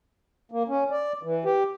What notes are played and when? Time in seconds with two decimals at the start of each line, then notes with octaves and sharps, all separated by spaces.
0.51 A#3
0.68 C#4
0.91 D5
1.23 E3
1.45 G4